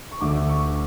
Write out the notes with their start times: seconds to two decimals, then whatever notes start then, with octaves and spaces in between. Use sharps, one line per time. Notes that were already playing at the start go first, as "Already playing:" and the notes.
0.11 C#6
0.21 D2 D3 A3 D6
0.49 C#6